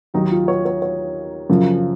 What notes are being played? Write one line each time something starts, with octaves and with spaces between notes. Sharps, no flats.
D#2 D#3 F#3 D#4
F4
C#5
C#5
C#5
F#2 C#3 F3